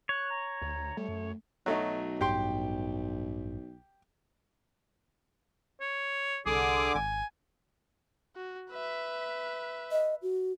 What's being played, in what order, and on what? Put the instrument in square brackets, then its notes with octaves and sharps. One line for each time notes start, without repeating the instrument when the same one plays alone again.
[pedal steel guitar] C#5 [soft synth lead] F#6
[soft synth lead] A#5
[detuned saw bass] D2
[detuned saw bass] G3 [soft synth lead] A3
[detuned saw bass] F#2
[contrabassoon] B1 [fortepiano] F#3 A3 D#4
[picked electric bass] A1 G2 [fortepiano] G4 G5 C6
[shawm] C#5
[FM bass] C2 [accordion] D3 D6 [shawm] G#4
[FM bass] G#1 [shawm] G#5
[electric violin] F#4
B4 E5
[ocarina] D#5
F#4